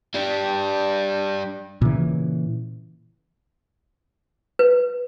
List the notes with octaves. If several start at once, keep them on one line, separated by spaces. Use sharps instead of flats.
G3 D4
A#2 C#3 E3
B4